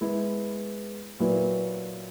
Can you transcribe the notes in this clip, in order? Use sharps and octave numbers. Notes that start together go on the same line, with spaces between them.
G#3 B3 E4
A#2 F#3 B3 E4 B4